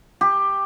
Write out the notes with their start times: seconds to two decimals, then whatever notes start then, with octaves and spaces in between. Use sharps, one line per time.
0.21 G4